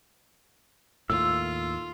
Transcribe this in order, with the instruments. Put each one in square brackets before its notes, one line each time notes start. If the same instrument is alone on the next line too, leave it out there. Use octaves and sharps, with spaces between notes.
[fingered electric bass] D#2 A2 [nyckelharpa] F4 [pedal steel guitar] E6